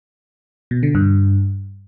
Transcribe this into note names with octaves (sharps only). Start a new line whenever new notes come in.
B2
D3
G2